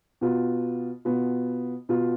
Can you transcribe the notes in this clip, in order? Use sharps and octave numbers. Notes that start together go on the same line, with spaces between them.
B2 B3 F4
B2 B3 F4
B2 B3 F4